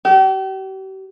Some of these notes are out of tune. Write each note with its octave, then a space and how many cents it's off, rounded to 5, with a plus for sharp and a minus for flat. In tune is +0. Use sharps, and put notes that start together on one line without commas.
G4 -40